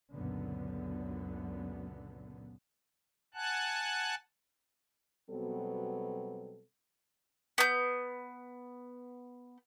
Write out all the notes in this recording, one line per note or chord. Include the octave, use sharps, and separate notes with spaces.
C#2 F#2 A#2 D3 F#3 B3
F#5 G#5 A5 F#6
B2 F#3 G3 B3 C4 A4
B3 G6